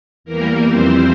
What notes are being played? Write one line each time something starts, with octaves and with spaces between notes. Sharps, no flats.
E2 E3 G3 A#3 A#4
F2 E3 G3 C4 C5